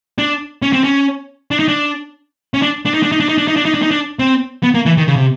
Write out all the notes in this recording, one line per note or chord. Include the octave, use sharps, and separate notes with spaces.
D4
C#4
C4
C#4
D4
D#4
D4
C#4
D4
D4
D#4
D4
D#4
D4
D#4
D4
D#4
D4
D#4
D4
D#4
D4
C4
B3
A#3
E3
D#3
C#3
C3